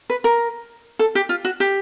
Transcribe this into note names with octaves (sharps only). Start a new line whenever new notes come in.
B4
A#4
A4
G4
F4
F#4
G4